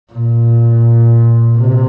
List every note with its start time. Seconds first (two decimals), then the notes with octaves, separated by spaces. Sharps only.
0.13 A#2
1.58 C3